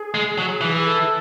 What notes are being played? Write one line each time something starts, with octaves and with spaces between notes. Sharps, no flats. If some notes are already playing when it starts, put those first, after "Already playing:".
Already playing: G#4
G#3
F#3
E3
G#4
A4